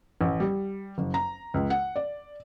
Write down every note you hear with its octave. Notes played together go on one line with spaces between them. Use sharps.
A1
G3
F#1
A#5
C#2
F#5
D5